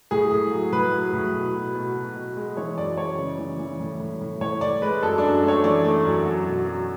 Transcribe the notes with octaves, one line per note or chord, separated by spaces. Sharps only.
A2 G#4
A2
F#3
A2 B4
F#3
A2
B2
B2
B2
B2
B2
G#3
E3 C#5
F#2 D5
G#3 C#5
C#3
E3
E3
A2
A2
A2
A2 C#5
A2 D5
G#3 B4
F#2 A4
F#2 D4
A3 C#5
E3 D5
A3
F#2
F#3
B2
F#3